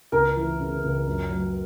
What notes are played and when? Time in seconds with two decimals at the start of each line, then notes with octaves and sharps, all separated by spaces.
0.12 C#2 A#4
0.36 E3
0.60 C#3
0.83 C#2
1.07 F#2
1.30 F#3